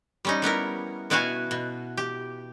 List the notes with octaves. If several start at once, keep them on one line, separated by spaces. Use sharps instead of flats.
G3 C#4 D#4
G3 B3 E4 A#4
B2 B3 E4 F#4 F5 G#5
B2
G4